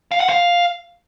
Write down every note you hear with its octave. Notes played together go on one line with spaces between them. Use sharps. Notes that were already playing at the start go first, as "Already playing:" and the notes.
F5
F#5
F5